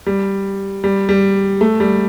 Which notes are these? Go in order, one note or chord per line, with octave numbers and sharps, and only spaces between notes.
G3
G3
G3
A3
G3